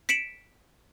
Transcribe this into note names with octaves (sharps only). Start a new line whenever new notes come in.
B6 C#7 D7 E7 F#7